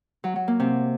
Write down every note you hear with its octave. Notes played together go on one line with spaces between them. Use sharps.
F#3
F#3
A#3
C3